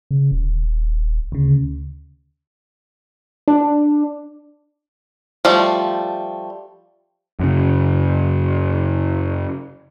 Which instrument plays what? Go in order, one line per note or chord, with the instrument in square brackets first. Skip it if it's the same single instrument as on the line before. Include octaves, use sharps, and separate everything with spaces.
[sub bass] C#3
D#1
[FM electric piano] D2 C#3
[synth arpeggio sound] D4
[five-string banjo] F3 G3 A3
[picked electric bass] F#2 C#3